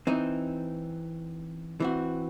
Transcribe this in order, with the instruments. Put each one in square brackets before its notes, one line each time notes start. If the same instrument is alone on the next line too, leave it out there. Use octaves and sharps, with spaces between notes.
[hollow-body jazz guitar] E3 C4 D#4
E3 C4 F#4